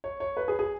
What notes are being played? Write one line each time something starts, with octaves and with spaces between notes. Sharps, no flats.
C#5
C#5
B4
G#4
G#4